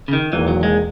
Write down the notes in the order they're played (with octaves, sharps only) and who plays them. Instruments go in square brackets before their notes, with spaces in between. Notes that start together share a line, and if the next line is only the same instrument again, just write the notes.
[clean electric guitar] C#3
D#3
[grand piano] E1 E2 D#3 A#3 [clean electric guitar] E3
[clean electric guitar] F#3
G#3